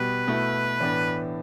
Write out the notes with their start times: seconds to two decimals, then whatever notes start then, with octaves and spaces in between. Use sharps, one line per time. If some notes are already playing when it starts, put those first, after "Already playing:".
Already playing: B2 G3 B3 B4
0.27 B2 A3 E4
0.80 A2 E3 B3 D4